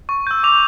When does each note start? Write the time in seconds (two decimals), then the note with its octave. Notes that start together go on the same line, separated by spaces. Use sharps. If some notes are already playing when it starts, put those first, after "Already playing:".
0.09 C#6
0.27 E6 G6
0.43 D6 F7